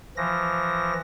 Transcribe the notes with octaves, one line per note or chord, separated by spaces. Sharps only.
E3 F3 A#6